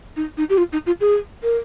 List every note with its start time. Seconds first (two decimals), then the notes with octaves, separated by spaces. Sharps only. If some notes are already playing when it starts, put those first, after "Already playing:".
0.16 D#4
0.38 D#4
0.50 G4
0.58 F4
0.73 D#4
0.86 F4
1.01 G#4
1.43 A#4